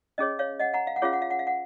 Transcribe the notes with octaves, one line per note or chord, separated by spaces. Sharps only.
C#4 G#4 C#5 D#5
C#5 F5
D#5 F#5
F#5 A#5
F5
F#5
C#4 F4 G#4 C#5 F5
F#5
F5
F#5
F5
F#5